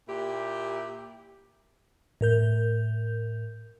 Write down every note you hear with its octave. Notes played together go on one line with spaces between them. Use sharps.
A#2 E4 G4
A2 A#4 G6